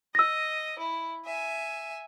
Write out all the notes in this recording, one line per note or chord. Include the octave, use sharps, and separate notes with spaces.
D#5 E6 A#6
E4
E5 G#5